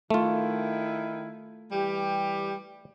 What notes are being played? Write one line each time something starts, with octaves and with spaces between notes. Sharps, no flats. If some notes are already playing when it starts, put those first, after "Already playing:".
D#3 A3 E4 F4
E3 G3 G4